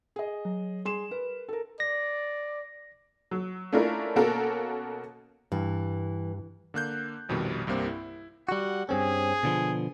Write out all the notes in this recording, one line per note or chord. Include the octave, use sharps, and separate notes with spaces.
G#4 D#5
F#3
G3 G#4 C6 E7
A#4 B4
A4 A#4
D5 A#6
F#3
A3 C#4 D4 E4 F4 A#4
B2 A#3 C#4 F#4 A4 A#4
G2 E3
D3 A#3 F#6 G6
A#1 F2 B2 D#3 G3
C2 G2 C3 A#3 C4
E4
G3 F#4 F#5
G2 C4 C#4 G#4
B2 D3 F3